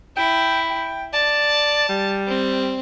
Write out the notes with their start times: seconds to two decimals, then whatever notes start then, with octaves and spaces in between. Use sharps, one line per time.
0.17 E4 G5
0.70 G5
1.13 D5 A5
1.89 G3
2.27 C4